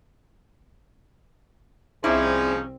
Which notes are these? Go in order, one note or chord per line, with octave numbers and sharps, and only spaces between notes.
C2 F3 C4 C#4 D#4 E4 G#4 D5